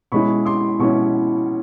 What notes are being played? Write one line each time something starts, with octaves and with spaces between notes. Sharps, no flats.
B2 G#3 C#4 E4 B5 C#6
C6 D6
B2 G#3 C#4 E4 C#6